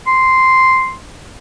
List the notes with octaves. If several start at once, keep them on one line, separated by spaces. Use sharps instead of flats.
C6